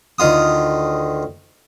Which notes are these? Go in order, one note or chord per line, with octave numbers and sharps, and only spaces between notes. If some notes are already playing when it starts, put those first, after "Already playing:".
D2 D#3 F4 D#6